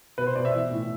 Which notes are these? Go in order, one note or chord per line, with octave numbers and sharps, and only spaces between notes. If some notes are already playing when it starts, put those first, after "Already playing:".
B2 B4
C5
B2 D5
E5
E3
A2